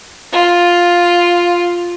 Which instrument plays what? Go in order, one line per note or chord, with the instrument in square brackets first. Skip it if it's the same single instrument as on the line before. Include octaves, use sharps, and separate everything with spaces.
[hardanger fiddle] F4